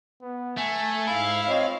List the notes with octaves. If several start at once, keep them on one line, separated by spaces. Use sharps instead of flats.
B3
A3 G#5
G#2 E4 F5
C4 F4 C#5 D#5